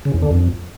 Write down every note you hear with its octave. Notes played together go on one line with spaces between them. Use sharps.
C#3
E2
D3
F2